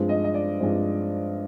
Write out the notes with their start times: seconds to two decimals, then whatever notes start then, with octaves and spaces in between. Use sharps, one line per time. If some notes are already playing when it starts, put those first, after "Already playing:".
Already playing: G2 F3 G#3 C4
0.09 D#5
0.24 D#5
0.34 D5
0.60 G2 F3 G#3 C4